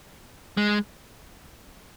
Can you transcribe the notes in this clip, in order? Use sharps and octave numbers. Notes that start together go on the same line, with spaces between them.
G#3